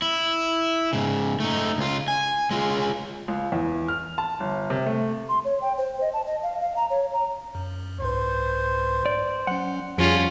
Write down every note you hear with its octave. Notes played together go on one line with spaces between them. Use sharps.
E4
G#2 C#3
A3 D#4
C#2 F4
G#5
G#3 F4
C#2
E2
F6
A5
G1
C3
A3
C6
C#5
G5
C5
D#5
A5
D#5
F5
F5
A#5
C#5
A#5
F#2
C2 G#2 B4 C5
D5
F#3 C#4 F#5
F2 F3 G3 C#4 F4 G#4